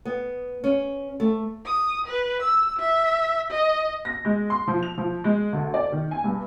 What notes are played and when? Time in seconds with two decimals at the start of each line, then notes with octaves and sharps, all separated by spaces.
0.05 B3
0.64 C#4
1.20 A3
1.66 D#6
2.07 B4
2.42 E6
2.79 E5
3.51 D#5
4.05 A#6
4.25 G#3
4.50 C6
4.68 F3
4.83 F7
4.98 F3
5.24 G#3
5.53 D2
5.74 D5
5.92 D#3
6.11 G#5
6.24 G2